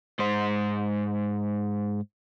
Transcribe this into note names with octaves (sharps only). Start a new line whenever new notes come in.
G#2 C5